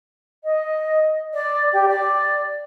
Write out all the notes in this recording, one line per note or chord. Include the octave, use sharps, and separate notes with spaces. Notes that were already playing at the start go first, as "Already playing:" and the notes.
D#5
D5
G4
D5